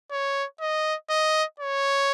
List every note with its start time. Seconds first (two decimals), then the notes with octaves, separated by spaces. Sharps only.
0.11 C#5
0.61 D#5
1.10 D#5
1.60 C#5